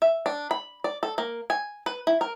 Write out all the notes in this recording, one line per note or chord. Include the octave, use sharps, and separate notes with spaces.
E5
D4
B5
D5
A4
A#3
G#5
B4
E4
A#4